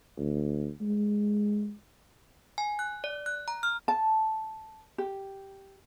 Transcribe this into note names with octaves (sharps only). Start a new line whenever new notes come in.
D2
G#3
G#5
F#6
D5
F#6
A#5
F6
A5
G4